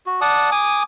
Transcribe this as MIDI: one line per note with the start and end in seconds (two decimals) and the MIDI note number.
0.06 0.20 66
0.21 0.50 74
0.21 0.50 78
0.21 0.50 81
0.21 0.50 87
0.52 0.83 80
0.52 0.83 86
0.52 0.83 87